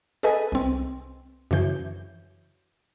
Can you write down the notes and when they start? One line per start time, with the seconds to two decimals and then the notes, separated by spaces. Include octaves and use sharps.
0.23 G#4 A4 B4 D#5 G#5
0.52 C2 C4
1.51 F#2 C#3 E3 G6